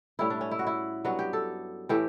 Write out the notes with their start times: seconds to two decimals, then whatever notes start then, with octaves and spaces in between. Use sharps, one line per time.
0.19 A2 G3 C#4 E4
0.30 D4
0.41 C#4
0.51 E4
0.59 F#4
0.67 E4
1.05 G2 F#3 B3 F#4
1.19 G4
1.33 A4
1.89 A2 E3 A3 G4